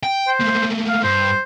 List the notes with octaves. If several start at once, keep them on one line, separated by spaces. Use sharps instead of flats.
G5
C5
A3 A#3
F5
G2 C5